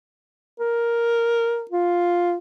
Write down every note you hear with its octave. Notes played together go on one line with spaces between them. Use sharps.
A#4
F4